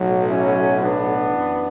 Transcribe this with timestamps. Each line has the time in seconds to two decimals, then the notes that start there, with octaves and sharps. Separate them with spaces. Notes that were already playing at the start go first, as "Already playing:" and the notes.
Already playing: B1 A2 F#3
0.29 C#4 E4
0.80 B3 D4
1.30 F#2 E3